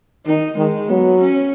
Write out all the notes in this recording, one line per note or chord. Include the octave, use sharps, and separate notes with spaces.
D#3 D#4
D#3 G#3
F#3 B3
C#4